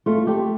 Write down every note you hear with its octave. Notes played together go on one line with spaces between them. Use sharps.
A3 F4
A3 G4